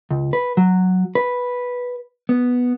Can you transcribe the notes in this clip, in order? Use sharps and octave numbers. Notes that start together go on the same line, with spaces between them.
C#2
B4
F#3
B4
B3